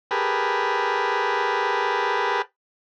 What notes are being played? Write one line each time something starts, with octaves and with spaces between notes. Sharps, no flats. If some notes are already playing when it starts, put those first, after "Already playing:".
G4 G#4 A#4 B4 A5 B5